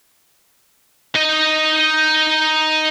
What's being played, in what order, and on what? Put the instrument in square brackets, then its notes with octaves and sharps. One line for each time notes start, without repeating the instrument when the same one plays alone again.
[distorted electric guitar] D#4 D#5